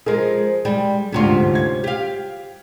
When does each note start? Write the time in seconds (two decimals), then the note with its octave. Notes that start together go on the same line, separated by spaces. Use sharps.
0.06 F3 G#3 G#4 A#4
0.65 G3 G#3
1.12 G1 D2 G#2 C3 C#4 F4
1.55 G#6
1.84 G4 F5